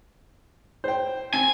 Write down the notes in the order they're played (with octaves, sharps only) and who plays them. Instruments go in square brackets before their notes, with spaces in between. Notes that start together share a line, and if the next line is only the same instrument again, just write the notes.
[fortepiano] C5 G5
[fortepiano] C4 [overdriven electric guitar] G#5